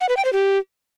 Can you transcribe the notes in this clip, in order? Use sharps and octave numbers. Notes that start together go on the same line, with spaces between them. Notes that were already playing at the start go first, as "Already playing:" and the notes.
F#5
B4
G5
C5
G4